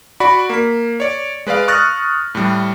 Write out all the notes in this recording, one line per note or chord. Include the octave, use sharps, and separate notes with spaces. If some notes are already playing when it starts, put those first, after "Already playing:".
F#4 D5 B5
A#3 B6
C#5 D5
G#3 B4 D5 F5
C#6 D#6 F6 F#6 A6 A#6
A2 G3